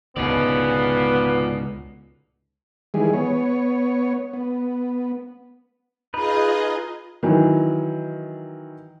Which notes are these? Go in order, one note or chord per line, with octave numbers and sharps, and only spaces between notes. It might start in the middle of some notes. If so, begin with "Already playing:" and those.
C#2 G#2 B2 D3 B3 C#4 F4 D5
D#3 E3 G3 G#3 G#4
B3 C#5
B3
D#4 F4 G#4 B4 D#5
D#3 E3 F#3